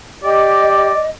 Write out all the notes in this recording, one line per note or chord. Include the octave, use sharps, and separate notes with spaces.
G4 D5 D#5